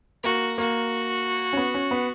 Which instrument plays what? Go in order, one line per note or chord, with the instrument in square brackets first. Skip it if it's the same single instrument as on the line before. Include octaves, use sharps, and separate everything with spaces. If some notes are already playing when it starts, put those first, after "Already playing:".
[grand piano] A#3 [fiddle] F#4
[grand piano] A#3 [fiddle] F#4
[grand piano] C#4
B3
C#4
B3